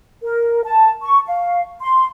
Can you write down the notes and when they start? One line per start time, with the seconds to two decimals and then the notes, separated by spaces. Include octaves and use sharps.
0.23 A#4
0.64 A5
1.02 C#6
1.27 F5
1.80 C6